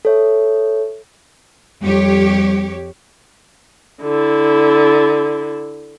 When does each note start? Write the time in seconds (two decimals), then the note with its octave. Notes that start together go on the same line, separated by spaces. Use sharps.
0.05 A4 C#5 E5
1.83 F2 G3 G4 C#5
4.01 D3 E4